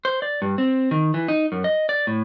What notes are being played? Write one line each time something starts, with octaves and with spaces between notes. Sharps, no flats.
C5
D5
G2
C4
D#3
E3
D#4
F#2
D#5
D5
A2